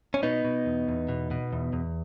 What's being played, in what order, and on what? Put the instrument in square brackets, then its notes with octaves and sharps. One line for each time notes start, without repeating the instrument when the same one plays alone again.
[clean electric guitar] C#4
B2 B3 D#4
B2
E2
E2
B2
B2
E2
E2